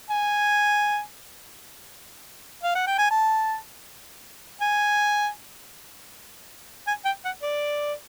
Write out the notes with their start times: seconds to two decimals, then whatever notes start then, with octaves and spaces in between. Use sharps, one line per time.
0.10 G#5
2.63 F5
2.75 F#5
2.87 G5
2.98 G#5
3.11 A5
4.61 G#5
6.87 G#5
7.05 G5
7.25 F#5
7.43 D5